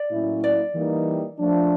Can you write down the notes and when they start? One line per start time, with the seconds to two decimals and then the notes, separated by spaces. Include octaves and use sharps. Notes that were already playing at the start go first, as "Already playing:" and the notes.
Already playing: D5
0.11 A2 F#3 A#3 C#4 E4
0.44 D5
0.75 E3 G3 A#3 D#4
1.39 F3 A3 D4